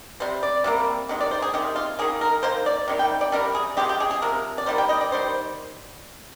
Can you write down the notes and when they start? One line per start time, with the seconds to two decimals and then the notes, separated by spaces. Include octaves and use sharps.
0.20 C3 G3 C5
0.43 D5
0.64 C3 G3 A#3
1.09 C3 D#3 G#3
1.21 D5
1.31 C5
1.42 G#4
1.53 C3 D#3 G#3 G4
1.76 F4
1.99 D#3 A#3 G#4
2.21 A#4
2.43 D#3 A#3 C5
2.66 D5
2.88 C3 D#3 G3
2.99 G5
3.21 D5
3.32 C3 D#3 G3 A#4
3.55 G#4
3.77 C3 F3 G#3 G4
3.89 G4
4.00 G#4
4.11 G#4
4.22 C3 F3 A#4
4.58 D5
4.66 D#3 G3 A#3 C5
4.78 G5
4.89 D#5
5.01 D5
5.12 D#3 G3 C5